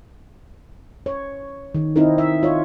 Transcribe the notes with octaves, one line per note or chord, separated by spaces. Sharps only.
C#5
D#3
C4 D#4 E4 A#4
E5
F4 C#5